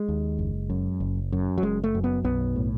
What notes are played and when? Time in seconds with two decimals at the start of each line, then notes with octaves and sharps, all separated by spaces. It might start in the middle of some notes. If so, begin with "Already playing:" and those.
Already playing: G#3
0.08 D#2
0.39 F#1
0.70 F#2
1.00 F#1
1.32 F#2
1.58 F#3
1.62 F#1 G#3
1.84 A3
1.94 F#2
2.04 B3
2.24 B1 B3
2.56 A2